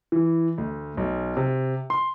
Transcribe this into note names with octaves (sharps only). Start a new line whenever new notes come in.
E3
D2
B1
C3
C6